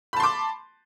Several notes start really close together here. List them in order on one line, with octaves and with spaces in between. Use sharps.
B5 A5 C6 D6